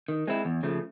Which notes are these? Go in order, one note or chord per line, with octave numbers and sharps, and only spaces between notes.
D#3
G#3 C4 E4
E2
C#3 F3 A3